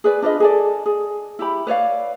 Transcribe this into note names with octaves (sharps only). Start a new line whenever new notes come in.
G#4 B4 D5
D4 F4 B4 D#5
G#4 A4 D5
G#4
E4 G4 B5
B4 C#5 D5 F5